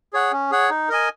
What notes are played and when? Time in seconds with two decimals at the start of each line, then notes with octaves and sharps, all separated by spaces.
0.13 G#4 C#5 F#5
0.32 C#4
0.51 G#4 C#5 F#5
0.70 D#4
0.89 A#4 D#5 G#5